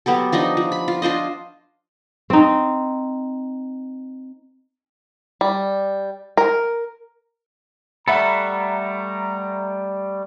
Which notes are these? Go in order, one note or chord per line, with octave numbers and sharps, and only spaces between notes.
F#3 B3 G4 A4
F3 D4 D#4 D#5
F3
B5
F4
D4 F4 C5 D#5
C4 D#4
G3
A#4
G3 A3 A4 E5 F#5 A#5 B5